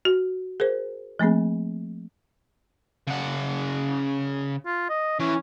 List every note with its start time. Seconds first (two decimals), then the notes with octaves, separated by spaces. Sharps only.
0.05 F#4
0.60 G#4 A#4 C5
1.19 F3 A3 A#3 C4 G#4
3.07 C#3 F#5
4.66 F4
4.89 D#5
5.19 E3 C#4